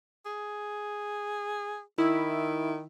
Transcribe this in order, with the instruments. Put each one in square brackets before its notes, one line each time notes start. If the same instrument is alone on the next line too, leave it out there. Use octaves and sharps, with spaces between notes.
[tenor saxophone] G#4
[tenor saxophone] D#3 [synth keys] E4